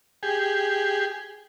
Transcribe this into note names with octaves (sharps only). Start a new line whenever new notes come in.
G4 G#4